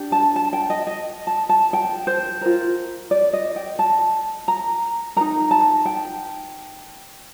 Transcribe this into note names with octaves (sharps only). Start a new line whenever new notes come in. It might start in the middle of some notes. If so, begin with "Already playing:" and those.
Already playing: D4 G4
A5
A5
G5
D#5
D#5
A5
A5
G5
C5
F4 A#4
D5
D#5
G5
A5
A#5
D#4 A#4 A#5
A5
G5